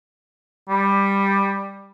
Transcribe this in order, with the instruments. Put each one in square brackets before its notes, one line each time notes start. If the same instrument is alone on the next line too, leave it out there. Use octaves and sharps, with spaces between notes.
[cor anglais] G3